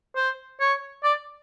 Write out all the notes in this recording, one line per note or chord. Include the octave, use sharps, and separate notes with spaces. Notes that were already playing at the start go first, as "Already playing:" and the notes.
C5
C#5
D5